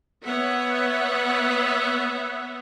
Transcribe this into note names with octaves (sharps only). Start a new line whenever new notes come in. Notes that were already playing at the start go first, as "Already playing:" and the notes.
B3 C#5 E5 F#5